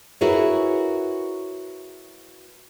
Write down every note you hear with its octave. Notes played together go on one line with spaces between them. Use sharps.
E4 F#4 G#4 A#4 B4 C#5